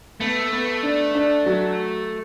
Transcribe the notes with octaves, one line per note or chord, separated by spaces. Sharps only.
A3 B3
B3
D4
D4
F#3